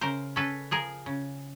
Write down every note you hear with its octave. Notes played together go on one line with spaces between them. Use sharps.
C#3 A#4 C5
C#4 A4 B4
F3 G#4 A#4
C#3